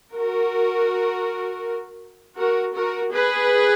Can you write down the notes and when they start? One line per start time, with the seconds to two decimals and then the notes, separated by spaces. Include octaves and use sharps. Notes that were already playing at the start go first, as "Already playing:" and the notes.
0.13 F#4 A#4
2.37 F#4 A#4
2.75 F#4 A#4
3.12 G#4 B4